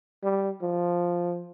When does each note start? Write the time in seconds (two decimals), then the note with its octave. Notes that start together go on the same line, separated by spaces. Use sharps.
0.23 G3
0.62 F3